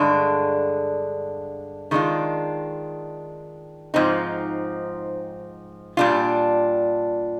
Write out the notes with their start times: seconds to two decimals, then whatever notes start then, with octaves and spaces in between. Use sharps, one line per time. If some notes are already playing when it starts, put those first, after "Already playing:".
Already playing: G2 D3 G#3 D4
1.91 D#3 G#3 D4 F4
3.94 G#2 F3 C4 D#4
5.97 A#2 G3 D4 F4